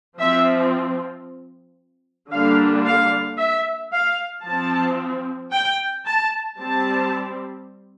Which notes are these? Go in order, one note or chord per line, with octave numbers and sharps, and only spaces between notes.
F3 C4 E5
D3 G3 A#3 D4 F5
F5
E5
F5
F3 C4 A5
G5
A5
G3 C4 A5